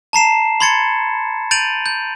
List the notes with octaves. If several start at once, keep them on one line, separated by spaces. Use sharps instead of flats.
A5 A#5 C7 E7
B5 C6 G#6 A6 C#7
G6 A6 D7 D#7 F7 F#7
G6